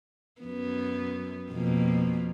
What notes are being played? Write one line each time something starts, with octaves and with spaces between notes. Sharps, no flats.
F#2 B3
F2 B2 A#3